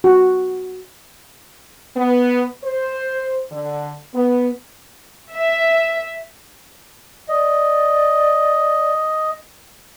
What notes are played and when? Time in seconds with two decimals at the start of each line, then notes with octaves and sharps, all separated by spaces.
0.04 F#4
1.96 B3
2.64 C5
3.52 D3
4.14 B3
5.34 E5
7.29 D5 D#5